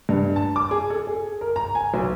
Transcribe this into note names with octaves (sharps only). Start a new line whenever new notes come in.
G2
A5
D6
G#4
A4
G#4
A#4
A#5
G#5
B1